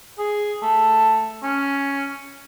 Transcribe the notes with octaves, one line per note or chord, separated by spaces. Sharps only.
G#4
A3
C#4